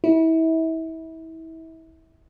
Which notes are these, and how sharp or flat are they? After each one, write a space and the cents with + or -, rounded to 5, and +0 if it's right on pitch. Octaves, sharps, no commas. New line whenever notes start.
E4 -30